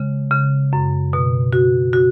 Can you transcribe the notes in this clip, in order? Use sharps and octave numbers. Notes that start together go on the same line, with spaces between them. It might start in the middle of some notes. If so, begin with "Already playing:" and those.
Already playing: C#3 G#3
C#3
F#2
B2
F#4
F#4